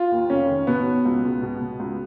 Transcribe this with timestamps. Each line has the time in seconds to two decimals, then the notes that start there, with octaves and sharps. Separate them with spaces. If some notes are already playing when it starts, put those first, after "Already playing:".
Already playing: F4
0.11 D#2
0.29 F1 C#4
0.48 D#3
0.67 B2 B3
0.86 B2
1.05 C#2
1.23 C#2
1.42 B2
1.61 B2
1.79 C#2